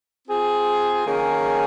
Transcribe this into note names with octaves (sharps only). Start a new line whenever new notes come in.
C4 F4 G#4
D#3 A#3 C#4 G#4